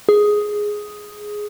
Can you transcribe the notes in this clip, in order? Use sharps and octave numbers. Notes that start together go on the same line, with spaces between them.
G#4